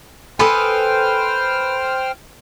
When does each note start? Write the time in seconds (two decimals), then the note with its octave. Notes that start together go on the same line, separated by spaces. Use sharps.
0.39 A4 B4 C5 G5 G#5 B5 D#6 F6